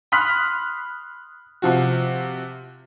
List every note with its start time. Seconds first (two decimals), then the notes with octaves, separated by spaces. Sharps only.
0.12 B5 C6 D#6 F6 F#6 B6
1.62 C3 F3 F#4